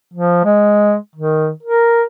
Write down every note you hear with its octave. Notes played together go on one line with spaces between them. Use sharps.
F3
G#3
D#3
A#4